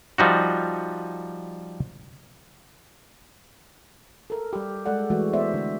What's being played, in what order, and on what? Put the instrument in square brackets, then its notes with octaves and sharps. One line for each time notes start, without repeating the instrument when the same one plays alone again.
[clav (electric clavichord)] F3 G3 D#4 F#4
[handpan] A4 A#4
G3 G4
G#3 A4 D5 F#5
E3 G#3 A3 F#4
B3 C5 D5 E5
D3